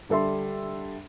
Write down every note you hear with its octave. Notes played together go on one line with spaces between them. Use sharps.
D3 G3 A4 E5 C6